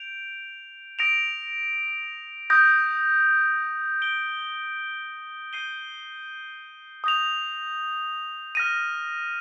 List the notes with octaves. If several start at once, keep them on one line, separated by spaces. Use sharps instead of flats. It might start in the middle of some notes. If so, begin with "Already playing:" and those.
Already playing: G6 D7 F7
D#6 A#6 D7 F7
D#6 G6 A#6
G6 D7 G7
G6 C7 D#7 G7
D#6 G6 A#6 F7
F6 A#6 D#7